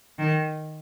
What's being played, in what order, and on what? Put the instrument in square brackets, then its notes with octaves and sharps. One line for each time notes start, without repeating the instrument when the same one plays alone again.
[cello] D#3